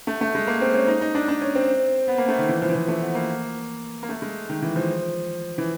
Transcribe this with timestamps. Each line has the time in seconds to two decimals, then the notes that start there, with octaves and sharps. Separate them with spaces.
0.07 A3
0.21 A3
0.35 G#3
0.47 A#3
0.61 C4
0.74 C#4
0.87 D#4
1.01 D#4
1.15 D4
1.28 D4
1.41 C#4
1.55 C4
2.08 B3
2.18 A#3
2.29 A3
2.38 D#3
2.49 E3
2.62 F3
2.69 E3
2.75 F3
2.88 A3
3.02 B3
3.15 A#3
4.03 A#3
4.09 A3
4.22 G#3
4.49 D#3
4.62 E3
4.76 F3
5.58 E3